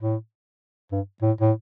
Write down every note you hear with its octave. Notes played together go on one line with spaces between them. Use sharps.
A2
G2
A2
A2